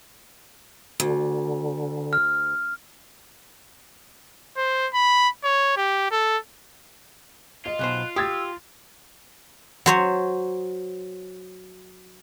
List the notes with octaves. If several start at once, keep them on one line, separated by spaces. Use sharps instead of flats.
D2 D3
F6
C5
B5
C#5
G4
A4
F4 D#5
B1 B2 C5 F#6
G4 D#6 E6 G#6 A6
F#3 C5 C#5